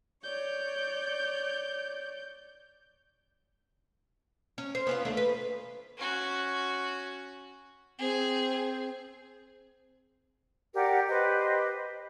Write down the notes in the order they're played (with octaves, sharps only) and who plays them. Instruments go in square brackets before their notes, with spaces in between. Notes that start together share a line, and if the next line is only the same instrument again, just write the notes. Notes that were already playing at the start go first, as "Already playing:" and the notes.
[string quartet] C#5 D5 [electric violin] G6
[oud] C#4
C5
B3 C#4 F4
D#2 A3 D4
B4
[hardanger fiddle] C#4 F#4
[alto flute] C4 [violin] G#4
[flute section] G4 A#4 D5 F#5
G4 B4 C5 D#5